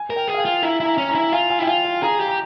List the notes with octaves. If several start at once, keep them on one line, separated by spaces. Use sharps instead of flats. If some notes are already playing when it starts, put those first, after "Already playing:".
Already playing: G#5
A#4
G5
G#4
F5
G5
F4
E4 A#5
E4
A#5
C#4
A#5
E4
F4 G#5
G#5
E4 G5
F4 G#5
G5
G#4 A#5
G4
A#5